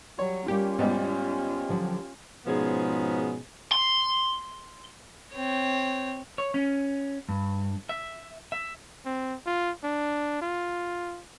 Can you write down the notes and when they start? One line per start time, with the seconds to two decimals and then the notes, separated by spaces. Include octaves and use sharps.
0.19 F#3 G3 C#5
0.48 G3 A#3 C#4 F4 G4
0.79 G#2 B2 G3 B3
1.69 D3 F3 F#3
2.46 G#2 B2 F3 B3 C#4 G#4
3.73 C6
5.34 C4 C#5
6.38 C#5
6.54 C#4
7.29 G2
7.89 E5
8.52 E5
9.06 C4
9.46 F4
9.84 D4
10.42 F4